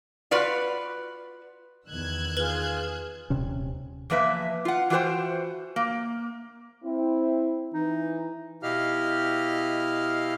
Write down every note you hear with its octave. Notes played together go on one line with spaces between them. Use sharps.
F4 F#4 B4 D5 F5
E2 D#3 E6 F#6 G#6
F4 G#4 B4 F6 F#7 G7
D#1 C3 C#4
E2 F3 A#3 B4 E5
F4 F#5
E3 F4 F#4 A#4 C5 G5
A#3
C4 E4
E3 D#4
B2 E4 G4 D#5 F5 F6